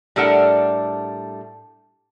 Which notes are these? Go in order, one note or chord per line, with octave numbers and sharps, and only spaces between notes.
A2 G3 D4 A4 A#4 F#5